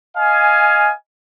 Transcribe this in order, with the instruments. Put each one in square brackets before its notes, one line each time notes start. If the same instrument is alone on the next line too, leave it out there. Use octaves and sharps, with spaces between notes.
[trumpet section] D#5 F5 G#5